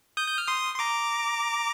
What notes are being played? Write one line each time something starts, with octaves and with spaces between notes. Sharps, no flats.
D#6 G6
G6
F6
C6 D#6
C6
A#5 D6